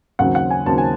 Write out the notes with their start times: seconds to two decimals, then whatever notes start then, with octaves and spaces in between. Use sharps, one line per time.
0.19 D#2 C#3 F#3 C4 F#5
0.35 F#5
0.50 G#5
0.66 D#2 C#3 F#3 C4 A5
0.78 G#5